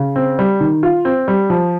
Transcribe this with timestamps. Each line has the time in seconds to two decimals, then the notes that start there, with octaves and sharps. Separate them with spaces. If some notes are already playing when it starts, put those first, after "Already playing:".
Already playing: C#3
0.16 C4
0.39 G3
0.60 D#3
0.83 F4
1.05 C4
1.28 G3
1.50 F3